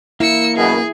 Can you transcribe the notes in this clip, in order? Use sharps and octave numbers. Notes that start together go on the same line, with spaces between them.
A#3 E4 E6 C#7
F#2 B2 G#4